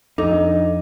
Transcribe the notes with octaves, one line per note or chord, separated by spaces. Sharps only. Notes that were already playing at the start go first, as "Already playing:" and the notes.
F2 D4 D#4 A4 D#5 D6